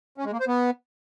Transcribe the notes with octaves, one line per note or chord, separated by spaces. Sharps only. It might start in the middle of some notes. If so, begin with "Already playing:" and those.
C#4
G#3
A#3
C5
B3